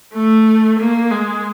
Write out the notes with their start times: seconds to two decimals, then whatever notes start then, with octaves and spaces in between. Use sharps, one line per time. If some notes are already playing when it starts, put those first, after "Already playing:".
0.13 A3
0.78 A#3
1.11 G#3